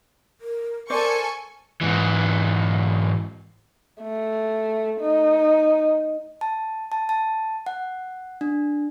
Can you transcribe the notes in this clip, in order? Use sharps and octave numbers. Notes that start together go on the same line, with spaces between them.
A#4
A4 A#4 C5 D5 G#5 C#6
G#2 E3
A3
D#4
A5
A5
A5
F#5
D4